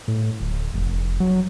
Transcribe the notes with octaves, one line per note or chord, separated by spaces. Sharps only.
A2
D1
F1
F#3